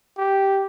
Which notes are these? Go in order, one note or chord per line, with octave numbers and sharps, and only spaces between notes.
G4